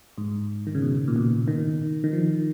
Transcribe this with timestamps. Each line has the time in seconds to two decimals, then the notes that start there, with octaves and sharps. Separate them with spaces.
0.18 G#2
0.67 D#3
0.75 C#3
0.82 B2
1.08 A#2
1.16 B2
1.48 D#3
2.04 D#3
2.13 F3